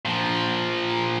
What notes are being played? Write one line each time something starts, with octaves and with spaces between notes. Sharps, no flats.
A#2 F3